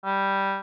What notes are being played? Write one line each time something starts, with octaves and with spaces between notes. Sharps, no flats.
G3